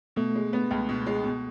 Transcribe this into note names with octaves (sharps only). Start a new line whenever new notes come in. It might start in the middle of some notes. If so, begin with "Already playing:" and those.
B2 A3
G#3
B3
C#2
B2
G#3
B2